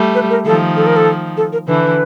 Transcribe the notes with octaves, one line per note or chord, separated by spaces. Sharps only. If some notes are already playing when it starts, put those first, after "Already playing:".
Already playing: G3 A3
B4
A#4
D#3 F3 A4
A4
A#4
A4
A4
A#4
D3 E3 B4